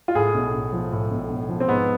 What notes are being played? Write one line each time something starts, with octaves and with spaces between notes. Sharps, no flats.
F4
A2 G#4
B1
B1
F3
A2
B1
B1
F3
C4
G#2 B3